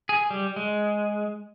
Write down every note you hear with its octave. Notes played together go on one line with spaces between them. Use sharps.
G#4
G3
G#3